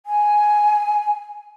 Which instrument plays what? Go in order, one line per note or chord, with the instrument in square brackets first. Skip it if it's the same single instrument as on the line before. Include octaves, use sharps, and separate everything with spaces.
[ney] G#5